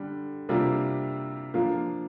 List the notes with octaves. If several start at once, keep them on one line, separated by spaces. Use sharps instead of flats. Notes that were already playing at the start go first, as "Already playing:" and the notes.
Already playing: D3 G3 D4
C3 G3 A#3 D4 F4
F3 A#3 D4 F4